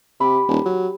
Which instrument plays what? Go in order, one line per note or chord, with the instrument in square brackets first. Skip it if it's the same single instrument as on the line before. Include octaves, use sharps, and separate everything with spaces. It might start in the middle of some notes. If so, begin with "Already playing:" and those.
[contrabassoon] C3 [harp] G4 B5
[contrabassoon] D#1
F#3